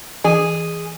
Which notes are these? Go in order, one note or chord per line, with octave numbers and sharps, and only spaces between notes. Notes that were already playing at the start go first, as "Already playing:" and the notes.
E3 G#4